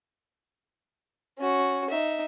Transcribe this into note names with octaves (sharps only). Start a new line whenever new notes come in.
C#4 F#4
D#4 E5